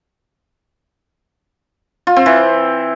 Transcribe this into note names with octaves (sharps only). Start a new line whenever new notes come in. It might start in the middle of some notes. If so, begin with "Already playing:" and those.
F4
C4
E3